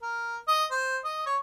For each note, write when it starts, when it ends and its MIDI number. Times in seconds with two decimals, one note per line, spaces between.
0.02 0.37 70
0.48 0.65 75
0.71 0.98 72
1.04 1.24 75
1.26 1.36 73